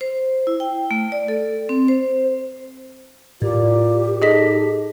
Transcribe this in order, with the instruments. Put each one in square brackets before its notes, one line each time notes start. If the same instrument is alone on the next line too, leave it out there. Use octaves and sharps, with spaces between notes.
[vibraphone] C5
E4
G5
A3
D5
A4
C4
C5
[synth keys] A2 [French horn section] F4 A#4 D5 [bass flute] G4
[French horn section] D#4 A4 [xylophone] G#4 D#5 B6